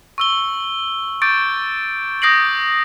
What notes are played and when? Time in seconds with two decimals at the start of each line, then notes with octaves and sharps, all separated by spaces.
0.18 C#6 E6 G7
1.22 C#6 D6 G6 A6 D7
2.22 D#6 G6 A#6 C7 D7 F#7